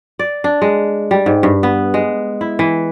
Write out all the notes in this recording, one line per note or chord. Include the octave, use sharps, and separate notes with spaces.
D5
D4
G#3
G3
G#2
G2
B3
G#3
E4
E3